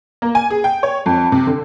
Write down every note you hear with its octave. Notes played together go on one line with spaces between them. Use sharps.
A#3
G#5
G#4
G5
C#5
F2
C3
D3